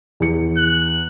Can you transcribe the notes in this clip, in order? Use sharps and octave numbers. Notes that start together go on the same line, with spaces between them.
E2 C#7
F#6